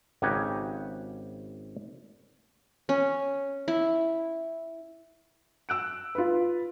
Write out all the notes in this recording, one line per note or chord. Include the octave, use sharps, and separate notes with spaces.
G#1 C#3 G4 F#5 G#5 A#5
C#4
E4
E6 F#6 D7
F4 B4